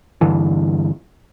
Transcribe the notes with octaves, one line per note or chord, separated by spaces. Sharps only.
G2 D3 E3